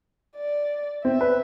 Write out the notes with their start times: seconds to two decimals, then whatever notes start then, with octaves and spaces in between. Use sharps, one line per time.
0.37 D5
1.05 C4 E5
1.21 B4